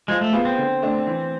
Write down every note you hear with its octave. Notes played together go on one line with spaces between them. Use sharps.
F3 G#3
A3
B3 F4 G#4
C4
D3
A3 D4
E3